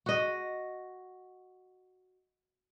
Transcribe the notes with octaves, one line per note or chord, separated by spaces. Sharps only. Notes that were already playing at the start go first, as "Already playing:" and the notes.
F#4 D#5